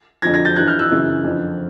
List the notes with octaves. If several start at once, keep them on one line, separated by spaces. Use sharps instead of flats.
F2 D3 F3 G#6 A#6
G#6 A#6
G6 A6
G2 E3 F#6 G#6
F6 G6
E6 F#6
F#2 C#3 E3
F2 D3 F3